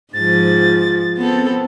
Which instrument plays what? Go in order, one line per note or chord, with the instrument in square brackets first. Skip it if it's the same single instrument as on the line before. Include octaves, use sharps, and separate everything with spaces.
[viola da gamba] G#2 F3 [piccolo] A6
[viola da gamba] B3 C4 A4